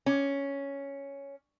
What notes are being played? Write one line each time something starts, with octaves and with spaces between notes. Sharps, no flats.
C#4